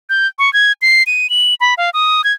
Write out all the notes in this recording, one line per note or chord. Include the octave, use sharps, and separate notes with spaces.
G6
C#6
G#6
C7
D#7
F#7
B5
F5
D#6
G#6